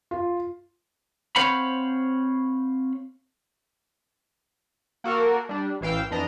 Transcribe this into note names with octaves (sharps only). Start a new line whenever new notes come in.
F4
C4 C5 C#5 F5 F#5 B5
A#3 F#4 A4 A#4
G3 D4
A1 E3 F5 G5 E6
F2 E3 D4 D#5 A#5